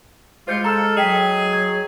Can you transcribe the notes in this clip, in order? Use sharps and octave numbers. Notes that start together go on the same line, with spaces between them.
G3 G#3 F4 C5 G6 C#7
A4 A#5 E6 F6
F#3 G#4 D#5 G5 B6
G#6